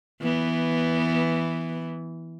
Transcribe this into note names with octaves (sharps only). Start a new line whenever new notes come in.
E3 B3